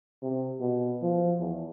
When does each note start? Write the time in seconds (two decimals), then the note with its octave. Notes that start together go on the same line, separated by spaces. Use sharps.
0.23 C3
0.61 B2
1.03 F3
1.40 E2